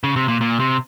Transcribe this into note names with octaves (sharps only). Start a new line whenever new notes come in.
C#3
C3
A#2
A#2
C3